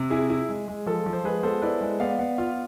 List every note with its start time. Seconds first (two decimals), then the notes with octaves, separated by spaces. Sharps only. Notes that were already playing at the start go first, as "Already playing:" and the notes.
Already playing: C3
0.10 E4 G#4
0.30 E4
0.49 G#3
0.68 G#3
0.86 F3 A4
1.06 F3
1.13 C5
1.24 G#3 G#4 B4
1.43 B3 A4 C5
1.62 E4 B4 D5
1.81 G#3
2.00 B3 D5 F5
2.19 B3
2.38 F4